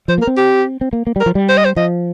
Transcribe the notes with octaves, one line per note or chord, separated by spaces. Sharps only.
F3 C5
A#3 A#4
C4
G4
C4
A#3
A#3
G3
A#4
F3
G3
C5
D#5
C5
F3 D#5